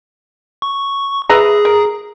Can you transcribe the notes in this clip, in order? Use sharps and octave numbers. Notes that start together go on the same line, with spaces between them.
C#6
G#4 B4 E5 A#5
A#4